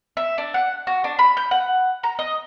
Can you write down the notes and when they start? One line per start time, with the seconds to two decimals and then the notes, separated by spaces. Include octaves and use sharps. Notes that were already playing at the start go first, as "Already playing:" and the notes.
0.17 E5
0.38 D4
0.54 F#5
0.87 F#4
1.04 D4
1.19 B5
1.37 G6
1.51 F#5
2.03 A#5
2.19 D#5